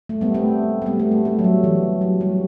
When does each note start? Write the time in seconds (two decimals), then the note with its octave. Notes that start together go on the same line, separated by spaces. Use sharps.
0.09 A3
0.21 G3 B3
0.34 A3 C4
0.82 A3
0.86 G3 B3
0.99 A3
1.11 G3
1.25 A3
1.39 F#3
1.44 G3
1.64 E3
2.01 F#3
2.21 G3